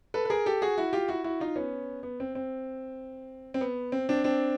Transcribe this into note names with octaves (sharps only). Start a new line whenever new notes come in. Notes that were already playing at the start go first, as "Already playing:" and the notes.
A4 B4
B4
G#4 A#4
G4 A4
F#4 G#4
E4 F#4
F4 G4
E4 F#4
E4 F#4
D#4 F4
B3 C#4
B3
C4
C4
C4
B3
C4
C4 D4
C4 D4